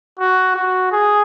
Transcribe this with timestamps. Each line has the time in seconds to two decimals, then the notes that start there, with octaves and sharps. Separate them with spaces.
0.19 F#4
0.56 F#4
0.92 G#4